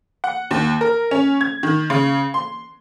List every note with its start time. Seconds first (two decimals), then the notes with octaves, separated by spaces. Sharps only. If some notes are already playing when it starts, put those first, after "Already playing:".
0.24 F#5
0.51 D#2
0.81 A#4
1.11 C#4
1.41 G#6
1.63 D#3
1.90 C#3
2.34 C6